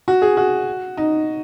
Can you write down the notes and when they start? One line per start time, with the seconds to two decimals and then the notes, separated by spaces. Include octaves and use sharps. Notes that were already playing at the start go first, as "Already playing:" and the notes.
0.08 F#4
0.22 G#4
0.37 F#4
0.97 D#4